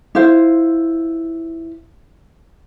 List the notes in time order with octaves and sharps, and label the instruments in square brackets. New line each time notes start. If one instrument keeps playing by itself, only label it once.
[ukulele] E4 F4 C5 F5